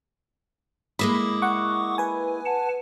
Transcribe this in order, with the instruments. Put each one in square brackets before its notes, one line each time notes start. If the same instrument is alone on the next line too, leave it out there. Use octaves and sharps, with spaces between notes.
[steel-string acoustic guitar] G#3 A#3 E4 [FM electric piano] B5 [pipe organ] D6 D#6
[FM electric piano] F#5 C#6
B4 G#5
[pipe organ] F#5 A5